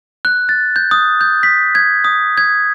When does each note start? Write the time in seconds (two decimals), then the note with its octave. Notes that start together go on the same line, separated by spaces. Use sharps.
0.25 F#6
0.49 A6
0.76 G6
0.91 D#6
1.21 G6
1.43 B6
1.75 G#6
2.04 D#6
2.37 G#6